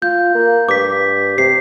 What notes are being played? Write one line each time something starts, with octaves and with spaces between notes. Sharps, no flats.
F4 G6
A#3
G2 D6 B6
C3 C7